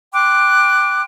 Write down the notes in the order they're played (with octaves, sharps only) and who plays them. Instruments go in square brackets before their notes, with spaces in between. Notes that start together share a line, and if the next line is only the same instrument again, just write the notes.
[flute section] G5 C6 D6 F#6